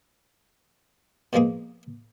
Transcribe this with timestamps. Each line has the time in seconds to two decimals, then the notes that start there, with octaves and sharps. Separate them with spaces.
1.33 B2 F3 G#3 A#3 G#4